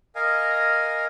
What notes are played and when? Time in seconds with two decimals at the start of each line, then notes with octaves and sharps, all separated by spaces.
0.15 A#4 D#5 F5 G#5